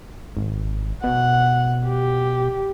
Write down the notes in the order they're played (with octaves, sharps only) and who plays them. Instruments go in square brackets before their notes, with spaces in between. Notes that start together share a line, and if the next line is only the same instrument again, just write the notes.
[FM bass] G#1
[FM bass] B2 [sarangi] F#5
[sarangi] G4